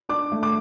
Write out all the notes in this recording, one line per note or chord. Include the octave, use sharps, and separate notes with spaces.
D4 D6
A3
D6